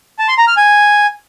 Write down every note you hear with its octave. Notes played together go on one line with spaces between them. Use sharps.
A5
C6
A#5
F6
G#5